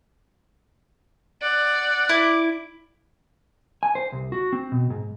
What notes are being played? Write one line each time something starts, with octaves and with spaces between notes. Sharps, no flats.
D5 F#5
E4 D6
G#5
C5
C2
F#4
C4
B2
G#2